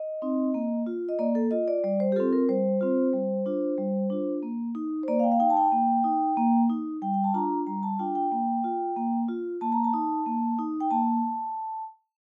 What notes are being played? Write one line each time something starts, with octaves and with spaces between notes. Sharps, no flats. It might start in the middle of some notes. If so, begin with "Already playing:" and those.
Already playing: D#5
C4 D#4
A#3
F4
D#5
A#3 D5
A4
F4 D#5
D5
G3 D5
C5
G4
C4 F4 A4
A#4
G3 C5
C4 F4
G3
D4 F4
G3
D4 F4
A#3
D#4
C5
A#3 D5
F5
G5
F5
D#4 G5
A5
G5
A#3
D#4
A#3
D#4
G3 G5
G5
A5
D4 F4 A#5
G3 A#5
A5
D4 F4 G5
G5
A#3
F4
A#3
F4
A#3 A5
A#5
A5
D#4
A#3
D#4
G5
A#3 A5